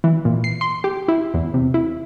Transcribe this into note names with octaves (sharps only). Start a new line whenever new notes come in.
E3
A#2
C7
C6
G4
E4
E2
C3
E4